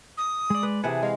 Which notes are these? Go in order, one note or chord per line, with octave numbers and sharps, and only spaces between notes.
D#6
G#3 D5
B4
C3 E3 G#4 F#5 G#5 A5
G#3 F5